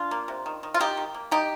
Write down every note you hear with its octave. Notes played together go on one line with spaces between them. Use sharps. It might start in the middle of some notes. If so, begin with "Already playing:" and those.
Already playing: D4 F4
A#3
C3
D#3
D#3
F4
D#3 D#4 G4
D#3
A#3
G3 D#4 G4